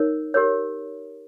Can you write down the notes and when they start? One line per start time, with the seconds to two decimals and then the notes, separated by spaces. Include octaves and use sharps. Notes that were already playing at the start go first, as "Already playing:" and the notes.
Already playing: D#4 A#4 C#5
0.34 G4 A#4 C#5